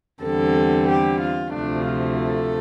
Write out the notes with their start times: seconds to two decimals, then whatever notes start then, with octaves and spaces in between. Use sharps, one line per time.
0.23 E2 D3 G3 C4 A4
0.88 G4
1.20 F4
1.53 D2 C3 F3 A3 D4
1.85 F4
2.18 A4